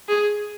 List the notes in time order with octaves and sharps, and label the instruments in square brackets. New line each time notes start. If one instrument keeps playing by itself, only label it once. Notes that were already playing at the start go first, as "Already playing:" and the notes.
[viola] G#4